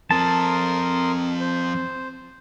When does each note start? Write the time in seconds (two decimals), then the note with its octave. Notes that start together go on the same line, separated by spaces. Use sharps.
0.11 F3 C4 A#4 A5 C6 D#6
1.40 C5